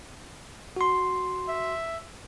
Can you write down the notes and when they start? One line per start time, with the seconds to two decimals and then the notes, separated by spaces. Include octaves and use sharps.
0.77 F#4 C6
1.48 E5